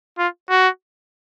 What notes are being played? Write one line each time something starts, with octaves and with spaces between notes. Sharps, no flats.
F4
F#4